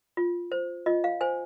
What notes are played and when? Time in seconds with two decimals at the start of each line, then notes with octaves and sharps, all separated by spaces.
0.17 F4
0.52 C5
0.86 F4 D#5
1.04 F5
1.21 C5 G#5